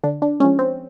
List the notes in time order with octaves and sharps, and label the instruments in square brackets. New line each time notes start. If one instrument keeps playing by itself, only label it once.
[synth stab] D3 D4
D4
F3 G#3 C#4
C4